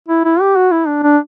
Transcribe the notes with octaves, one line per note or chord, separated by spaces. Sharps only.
E4
E4
G4
F#4
E4
D4
D4